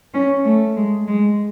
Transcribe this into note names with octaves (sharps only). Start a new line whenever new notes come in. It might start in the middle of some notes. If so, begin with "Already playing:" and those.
C#4
A3
G#3
G#3